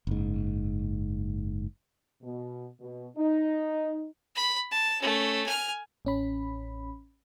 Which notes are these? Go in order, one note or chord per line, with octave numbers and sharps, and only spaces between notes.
F#1 G#2
B2
B2
D#4
B5
A5
A3 C#4
G#5 F6
A1 C#4 B5